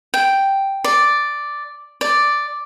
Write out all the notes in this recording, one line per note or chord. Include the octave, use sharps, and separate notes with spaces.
G5
D5
D5